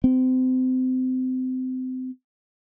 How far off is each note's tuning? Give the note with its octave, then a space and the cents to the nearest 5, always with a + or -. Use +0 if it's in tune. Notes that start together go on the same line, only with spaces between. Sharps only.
C4 -30